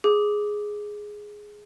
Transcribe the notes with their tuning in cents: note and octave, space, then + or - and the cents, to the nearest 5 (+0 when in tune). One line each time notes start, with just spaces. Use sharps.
G#4 +0 D6 +0